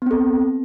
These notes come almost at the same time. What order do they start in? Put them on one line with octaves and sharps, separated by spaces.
B3 C4 A4